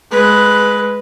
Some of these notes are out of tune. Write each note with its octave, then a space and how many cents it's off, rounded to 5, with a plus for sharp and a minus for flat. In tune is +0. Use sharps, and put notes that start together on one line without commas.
G#3 +10 B4 +0